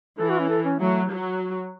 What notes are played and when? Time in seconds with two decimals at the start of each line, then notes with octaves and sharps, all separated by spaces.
0.19 E3 A4
0.29 F#4
0.39 C#4
0.49 A4
0.65 C#4
0.80 F#3 A3
1.10 F#3